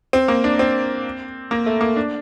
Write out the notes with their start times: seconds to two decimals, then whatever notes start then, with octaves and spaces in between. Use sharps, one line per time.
0.13 C4
0.28 A#3
0.44 D4
0.59 C4
1.51 A#3
1.66 A3
1.81 A#3
1.96 D4